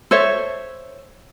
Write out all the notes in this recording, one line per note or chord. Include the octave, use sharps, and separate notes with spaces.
A4 C5 C#5 E5